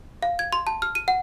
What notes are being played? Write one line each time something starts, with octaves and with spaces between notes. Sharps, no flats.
F5
G#6
C6
A5
F6
D#7
F#5